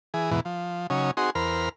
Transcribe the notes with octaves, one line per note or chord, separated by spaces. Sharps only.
E3 G#4
E2 G#2 B2 E3
F3
C#3 F#3 C#4 D#4
C4 D#4 F#4 G#4 C6
E2 A#4 C5 B5 F6